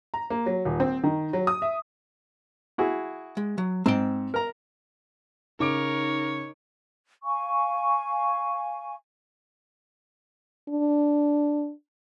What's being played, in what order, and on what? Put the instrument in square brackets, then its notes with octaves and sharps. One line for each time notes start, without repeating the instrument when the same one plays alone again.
[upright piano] A#5
A#3
F#3
D#1
C4
D#3
F#3
D#6
E5
[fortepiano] E4 F#4 G#4
[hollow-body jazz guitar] G#3
F#3
[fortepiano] G#2 [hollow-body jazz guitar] C4 G5
[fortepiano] A#4 A#5
[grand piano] C#3 D6 D7 [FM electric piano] D#4 [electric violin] A#4 [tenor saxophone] C#5
[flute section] F5 G#5 C#6
[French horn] D4